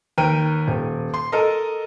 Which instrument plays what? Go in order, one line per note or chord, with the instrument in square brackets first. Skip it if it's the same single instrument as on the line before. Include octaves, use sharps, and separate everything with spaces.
[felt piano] D#2 A#4 B4 G5 D#7
D#1
C6
A4 A#4 D#5